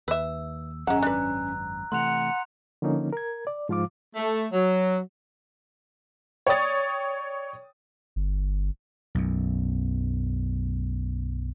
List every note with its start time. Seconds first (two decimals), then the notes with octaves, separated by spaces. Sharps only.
0.08 D#2 B4 E5 E6
0.87 G#1 F#2 G#3 C#4 F#5 A#5
1.03 D4 B4 F#6
1.92 C3 E3 A3 F#5 C6 F#6 F7
2.82 D3 F3 A#3 C#4 D#4
3.13 A#4 G#6
3.47 D5
3.69 G#2 F3 F4 F5 D6
4.16 A3
4.53 F#3
6.47 C#5 D5 G5 D#6 A6
8.16 G1
9.15 B1 F#2